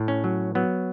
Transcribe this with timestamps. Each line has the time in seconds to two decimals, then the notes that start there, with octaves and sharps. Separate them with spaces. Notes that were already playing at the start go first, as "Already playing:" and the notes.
Already playing: A2
0.08 C#4
0.24 F#3
0.55 F#3 B3